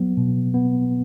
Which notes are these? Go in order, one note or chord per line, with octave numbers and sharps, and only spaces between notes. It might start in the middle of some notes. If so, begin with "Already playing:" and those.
Already playing: F#3 B3
B2
B3